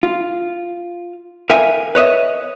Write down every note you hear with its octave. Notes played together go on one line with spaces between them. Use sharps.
F4
A#4 E5 F5 G5 G#5
B4 C#5 D#5 E5